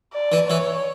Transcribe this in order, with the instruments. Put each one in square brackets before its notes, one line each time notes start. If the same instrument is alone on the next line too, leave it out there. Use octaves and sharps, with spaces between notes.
[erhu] D5
[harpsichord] E3
[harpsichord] E3 [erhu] C#5